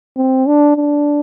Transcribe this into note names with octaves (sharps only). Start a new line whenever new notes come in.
C4
D4
D4